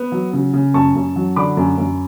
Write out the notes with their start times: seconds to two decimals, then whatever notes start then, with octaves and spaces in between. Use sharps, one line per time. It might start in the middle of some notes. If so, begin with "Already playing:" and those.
Already playing: B3
0.12 F#3
0.33 C#3
0.54 C#3
0.74 F#2 A5 C#6
0.95 F#2
1.16 F#3
1.36 D3 B5 D6
1.57 F#2
1.78 F#2